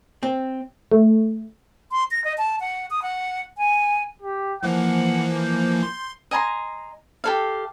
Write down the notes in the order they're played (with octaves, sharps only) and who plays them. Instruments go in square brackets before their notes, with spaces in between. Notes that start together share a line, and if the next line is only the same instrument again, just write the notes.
[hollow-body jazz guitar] C4
[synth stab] A3
[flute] C6
A#6
D#5
A5
F#5
D#6
F#5
G#5
[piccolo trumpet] G4
[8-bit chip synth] E3 F3 A#3 [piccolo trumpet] F#5
[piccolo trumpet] G6
[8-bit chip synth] C6
[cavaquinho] D#5 G#5 A#5 C6
G4 A4 F5